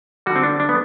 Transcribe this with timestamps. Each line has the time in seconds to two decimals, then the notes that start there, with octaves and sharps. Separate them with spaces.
0.26 D3 G3 F#4
0.35 C4
0.43 D4
0.60 D4
0.69 B3